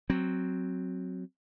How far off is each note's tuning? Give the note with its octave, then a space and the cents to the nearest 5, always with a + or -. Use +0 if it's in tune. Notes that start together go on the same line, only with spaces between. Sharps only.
F#3 +0 C4 +0